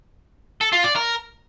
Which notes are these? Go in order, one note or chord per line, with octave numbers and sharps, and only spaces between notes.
A4
F4
D5
A#4